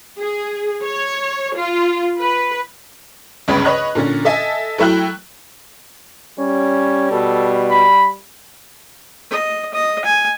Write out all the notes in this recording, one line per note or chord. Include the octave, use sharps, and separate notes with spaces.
G#4
C#5
F4
B4
G1 C#2 C#3 C#4 G#4 B5
B4 C#5 D#5 F#6
A#2 D3 C#4
A4 D#5 E5 G#5
F#3 A3 E4 G5 F#6
G3 C#4
B2 A4
B5
D#5
D#5
G#5